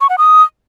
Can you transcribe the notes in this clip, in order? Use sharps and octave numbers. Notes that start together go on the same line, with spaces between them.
C#6
F#5
D#6